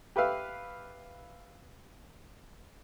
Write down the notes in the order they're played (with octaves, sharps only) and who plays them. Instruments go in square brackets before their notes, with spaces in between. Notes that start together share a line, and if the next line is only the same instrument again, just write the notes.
[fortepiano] G4 B4 E5 F5